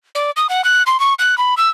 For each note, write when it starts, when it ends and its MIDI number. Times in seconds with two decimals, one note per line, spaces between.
0.15 0.31 74
0.37 0.47 87
0.49 0.64 78
0.64 0.83 90
0.86 1.00 84
1.00 1.14 85
1.19 1.37 90
1.38 1.55 83
1.57 1.70 88